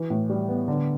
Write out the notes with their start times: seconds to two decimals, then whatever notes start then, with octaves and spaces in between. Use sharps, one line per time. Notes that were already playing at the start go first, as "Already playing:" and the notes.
Already playing: E3
0.10 A2
0.30 G3
0.49 B3
0.68 D3